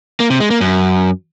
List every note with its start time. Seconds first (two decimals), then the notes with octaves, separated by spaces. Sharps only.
0.20 A#3
0.30 C3
0.40 G#3
0.50 A#3
0.61 F#2